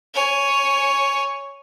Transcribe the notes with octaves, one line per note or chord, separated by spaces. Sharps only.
C#5 G#5